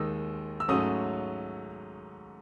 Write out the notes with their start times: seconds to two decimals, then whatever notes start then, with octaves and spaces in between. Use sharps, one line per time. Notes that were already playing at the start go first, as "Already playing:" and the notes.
Already playing: D#2 D#3 G#3 D#4 E6
0.60 E6
0.68 G#2 F#3 A3 C#4 D#6